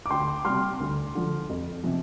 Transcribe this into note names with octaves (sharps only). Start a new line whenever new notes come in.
D6
D2 G5 C6
C3 G3 C6 F6
D2
D3 F3
F2
C3 F3